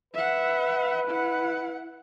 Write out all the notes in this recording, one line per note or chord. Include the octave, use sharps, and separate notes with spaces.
B4 E5 F#5
E4 F#5